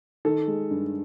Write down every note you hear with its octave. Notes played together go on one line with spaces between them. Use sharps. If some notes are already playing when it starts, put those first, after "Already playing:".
D#3 A4
G#3
G2